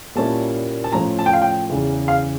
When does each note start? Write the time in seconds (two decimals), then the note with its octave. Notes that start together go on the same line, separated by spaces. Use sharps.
0.15 A#2 G3 A#3 C#4 E4 A5
0.84 A5
0.92 A2 F3 C#4 A#5
1.19 A5
1.26 G5
1.33 F5
1.42 G5
1.69 E2 C#3 E3
2.08 F5